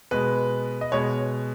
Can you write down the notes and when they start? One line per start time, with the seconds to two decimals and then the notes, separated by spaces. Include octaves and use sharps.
0.11 B2 G#3 B4
0.81 D#5
0.92 B2 G#3 C#5